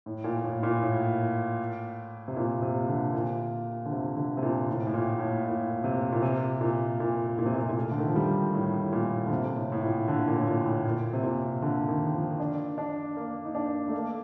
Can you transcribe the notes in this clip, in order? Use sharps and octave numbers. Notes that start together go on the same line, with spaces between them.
A2
A#2
A2
A#2
A2
C3
A#2
C3
D3
A#2
D3
C3
D3
C3
A#2
A2
A2
A#2
A2
A#2
C3
A#2
C3
A#2
A#2
A#2
C3
A#2
C3
A#2
A3
D3
D#3
F3
G3
A2
A2
A#2
D3
C3
A2
A2
A#2
D3
A#2
A2
A#2
A2
A#2
C3
A#2
D3
D#3
F3
D4
D4
A#3
D#4
D4
A3
A#3